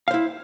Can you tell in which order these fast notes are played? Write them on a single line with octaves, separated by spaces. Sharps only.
F5 C5 E4